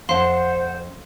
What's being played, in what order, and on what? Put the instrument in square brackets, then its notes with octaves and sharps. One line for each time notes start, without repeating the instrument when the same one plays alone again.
[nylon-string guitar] F2 A5 [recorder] C5 [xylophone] F5 C6 [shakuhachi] F#5